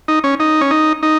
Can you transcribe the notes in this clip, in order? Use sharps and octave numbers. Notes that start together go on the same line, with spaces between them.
D#4
C#4
D#4
C#4
D#4
D#4